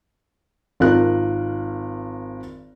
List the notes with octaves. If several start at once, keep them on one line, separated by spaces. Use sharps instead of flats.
G#1 F4 A#4 F#6